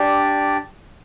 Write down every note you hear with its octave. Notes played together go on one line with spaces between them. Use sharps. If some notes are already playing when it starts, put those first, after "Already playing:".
Already playing: D4 G4 D5